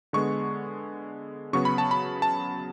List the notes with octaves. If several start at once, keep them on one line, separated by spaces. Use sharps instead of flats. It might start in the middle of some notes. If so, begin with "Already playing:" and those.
D3 G#3 B3 C#6
C#3 F#3 B3 C#6
B5
A5
B5
A5